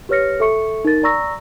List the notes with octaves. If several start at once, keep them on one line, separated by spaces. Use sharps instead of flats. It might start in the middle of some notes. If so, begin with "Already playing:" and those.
G4 B4 C#5 F6 A#6 C#7
A4 E5 C#6 C#7
D#4 A#4 A6
D5 A#5 C#6 E6 A#6